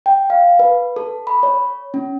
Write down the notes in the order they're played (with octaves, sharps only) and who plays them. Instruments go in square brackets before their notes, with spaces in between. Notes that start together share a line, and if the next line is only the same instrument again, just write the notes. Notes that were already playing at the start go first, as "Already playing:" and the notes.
[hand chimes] G5
F5
B4
A4
B5
C#5
C#4